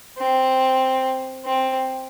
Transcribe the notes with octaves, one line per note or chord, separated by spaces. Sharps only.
C4
C4